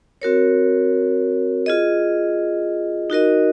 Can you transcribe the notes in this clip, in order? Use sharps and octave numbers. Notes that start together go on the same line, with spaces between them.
C4 F#4 A#4 C#5
F4 G#4 D#5
D#4 F#4 A#4 D#5